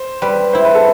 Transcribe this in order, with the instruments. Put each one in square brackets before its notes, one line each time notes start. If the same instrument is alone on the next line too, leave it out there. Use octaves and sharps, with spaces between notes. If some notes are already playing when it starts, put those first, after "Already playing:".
Already playing: [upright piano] C5
[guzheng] G3 [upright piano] B4
[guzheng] E4 [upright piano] C5
[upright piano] B4
A4